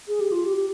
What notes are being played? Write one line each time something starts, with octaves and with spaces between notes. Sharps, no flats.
G#4
G4
F4
G4
G4